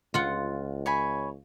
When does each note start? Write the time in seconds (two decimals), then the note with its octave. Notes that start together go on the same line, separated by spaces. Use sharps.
0.14 C#2 F4 F#5
0.86 C#5 G#5 B5